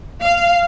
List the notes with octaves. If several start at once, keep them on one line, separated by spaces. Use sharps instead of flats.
F5